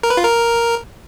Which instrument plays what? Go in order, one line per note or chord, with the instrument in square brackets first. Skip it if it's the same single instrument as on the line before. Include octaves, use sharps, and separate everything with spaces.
[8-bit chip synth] A#4
B4
F4
A#4